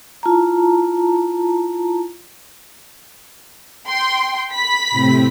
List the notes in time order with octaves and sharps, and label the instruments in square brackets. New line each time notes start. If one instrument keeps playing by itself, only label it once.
[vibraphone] E4 F4 A5 A#5
[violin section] G5 C6
B5 B6
[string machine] A2 C3 C4